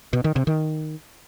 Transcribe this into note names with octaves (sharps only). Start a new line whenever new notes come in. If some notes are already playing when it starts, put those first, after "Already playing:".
B2
D#3
C3
D#3